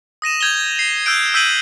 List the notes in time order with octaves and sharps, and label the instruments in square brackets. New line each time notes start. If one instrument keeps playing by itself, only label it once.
[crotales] D#6 A#6 D#7 E7
G6 G#6 F7 G7
C7
E6 F#6 G6 D7
E6 G6 B6 D7 D#7 F#7